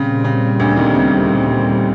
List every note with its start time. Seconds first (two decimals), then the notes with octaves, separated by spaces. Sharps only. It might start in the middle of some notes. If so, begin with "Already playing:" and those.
Already playing: A#2 C#3 G3 C4
0.24 C#3
0.60 D2 D3
0.76 D#2 D#3
0.94 C#3